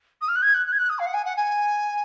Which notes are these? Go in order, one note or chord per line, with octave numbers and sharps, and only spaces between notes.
D#6
F6
F#6
G#6
F#6
F#6
G#6
F#6
D#6
F5
F#5
G#5
F#5
G#5